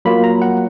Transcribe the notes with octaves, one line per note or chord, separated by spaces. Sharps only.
F#3 A#3 F4 B5
A#5
F#5